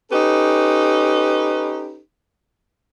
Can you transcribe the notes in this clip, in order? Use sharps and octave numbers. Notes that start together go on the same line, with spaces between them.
C#4 D#4 G4 A4 B4